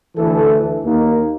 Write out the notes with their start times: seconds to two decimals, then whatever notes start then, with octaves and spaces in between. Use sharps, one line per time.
0.15 D2 E3 A4
0.84 D#2 A#3